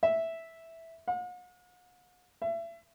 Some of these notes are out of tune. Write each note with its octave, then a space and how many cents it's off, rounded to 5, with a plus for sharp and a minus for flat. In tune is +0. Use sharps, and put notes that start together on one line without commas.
E5 -5
F#5 -45
E5 +30